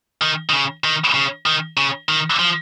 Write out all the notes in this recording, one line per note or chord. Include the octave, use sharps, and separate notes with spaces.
D#3
D#3
C#3
D#3
C#3
D#3
C#3
D#3
F3